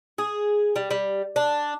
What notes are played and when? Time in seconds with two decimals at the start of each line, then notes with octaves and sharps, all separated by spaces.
0.18 G#4
0.76 G3
0.91 G3
1.36 D4